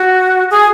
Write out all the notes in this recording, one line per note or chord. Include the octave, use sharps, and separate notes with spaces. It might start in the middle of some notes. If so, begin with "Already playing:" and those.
Already playing: F#4
G#4